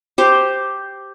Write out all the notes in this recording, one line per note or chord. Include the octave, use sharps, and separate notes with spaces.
G4 C5